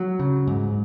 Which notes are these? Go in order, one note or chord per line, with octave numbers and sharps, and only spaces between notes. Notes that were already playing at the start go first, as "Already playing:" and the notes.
Already playing: F#3
C#3
G#2